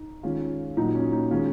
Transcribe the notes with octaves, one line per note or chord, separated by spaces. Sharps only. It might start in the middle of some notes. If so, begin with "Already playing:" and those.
Already playing: D#4
D#3 G#3 C#4 F4
A#2 F#3 A#3 D#4
C#4
D#4
D#3 G#3 C#4 F4